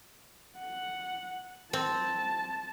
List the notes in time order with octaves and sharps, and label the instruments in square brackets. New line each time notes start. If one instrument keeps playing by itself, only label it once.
[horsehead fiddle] F#5
[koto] C4 [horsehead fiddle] A5